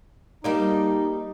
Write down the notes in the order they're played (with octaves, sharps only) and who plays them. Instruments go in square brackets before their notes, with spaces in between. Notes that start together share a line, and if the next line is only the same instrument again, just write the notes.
[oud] G3 A#3 D4 [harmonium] D#4